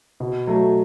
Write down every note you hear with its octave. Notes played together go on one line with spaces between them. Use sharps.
B2
F#3 A3